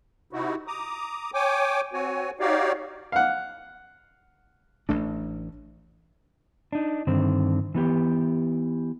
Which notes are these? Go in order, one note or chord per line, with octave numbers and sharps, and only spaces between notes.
C3 D#4 E4 F#4
A#5 D6 D#6
C#5 G5 G#5 D6
C4 F#4 C#5 G#5
D#4 F#4 G4 C#5 D5 F5
F5 F#5
A1 A3 D4
D4 D#4
G2 D3 D#3 C4
E3 B3 G4